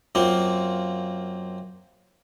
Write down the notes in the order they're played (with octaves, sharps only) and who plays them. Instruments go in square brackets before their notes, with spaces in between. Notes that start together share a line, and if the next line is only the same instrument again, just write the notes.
[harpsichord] F#2 A#3 C4 F4